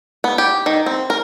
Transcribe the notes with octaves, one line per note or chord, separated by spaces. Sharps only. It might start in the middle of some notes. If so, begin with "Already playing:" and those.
B3
G4
D#3
C4
A#4